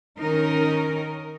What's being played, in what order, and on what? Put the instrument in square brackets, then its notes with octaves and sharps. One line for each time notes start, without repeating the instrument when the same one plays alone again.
[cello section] D#3 C#4 D#4 A#4